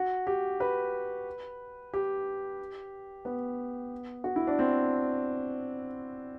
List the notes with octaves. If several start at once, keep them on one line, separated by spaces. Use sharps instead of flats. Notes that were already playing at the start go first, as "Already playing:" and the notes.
Already playing: F#4
G4
B4
G4
B3
F#4
E4
D4
C4